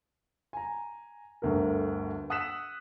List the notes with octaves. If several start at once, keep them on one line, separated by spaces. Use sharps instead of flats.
G#5 A#5
G1 D2 A#4
F#5 D#6 E6 F#6 B6 E7